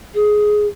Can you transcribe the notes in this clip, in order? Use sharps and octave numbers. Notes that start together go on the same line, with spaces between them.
G#4